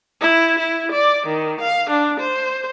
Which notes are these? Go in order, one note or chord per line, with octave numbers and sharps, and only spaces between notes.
E4
E4
D5
D#3
F5
D4
C5